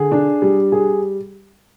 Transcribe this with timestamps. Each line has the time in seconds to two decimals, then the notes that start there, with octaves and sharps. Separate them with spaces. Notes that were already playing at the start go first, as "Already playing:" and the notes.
Already playing: D3 G#4
0.12 D4
0.42 G3
0.72 G#4